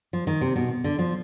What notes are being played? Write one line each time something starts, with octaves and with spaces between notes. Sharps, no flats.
F3
D#3
C3
B2
D3
F3